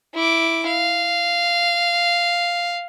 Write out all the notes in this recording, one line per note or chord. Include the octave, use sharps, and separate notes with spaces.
E4 D6
F5